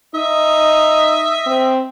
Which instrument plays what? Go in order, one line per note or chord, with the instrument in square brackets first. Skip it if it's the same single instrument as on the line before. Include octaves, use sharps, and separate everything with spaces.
[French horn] D#4 [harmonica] D#5 E5
[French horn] C4